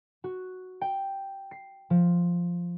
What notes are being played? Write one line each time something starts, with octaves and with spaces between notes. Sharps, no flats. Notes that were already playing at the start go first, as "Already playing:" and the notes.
F#4
G5
C7
F3